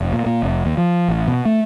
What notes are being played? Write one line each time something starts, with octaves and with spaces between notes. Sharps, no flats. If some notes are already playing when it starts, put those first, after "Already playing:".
F1
A#2
A#2
F1
D#2
F3
A1
B2
A3